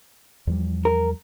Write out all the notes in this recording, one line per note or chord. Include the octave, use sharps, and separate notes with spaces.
E2 F3 G3
A#4